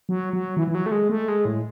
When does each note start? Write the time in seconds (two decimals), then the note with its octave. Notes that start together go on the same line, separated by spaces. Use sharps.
0.09 F#3
0.33 F#3
0.57 E3
0.68 E3
0.75 F#3
0.86 A3
0.92 G#3
1.09 A3
1.28 G#3
1.45 A2